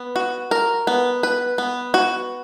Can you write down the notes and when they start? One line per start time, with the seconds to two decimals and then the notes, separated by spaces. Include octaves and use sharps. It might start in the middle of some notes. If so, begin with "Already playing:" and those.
Already playing: B3
0.16 F#4
0.51 A#4
0.87 B3
1.23 B4
1.58 B3
1.94 F#4